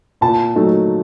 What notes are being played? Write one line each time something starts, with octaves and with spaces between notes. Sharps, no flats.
A#2 A5
F#3 A3 D#4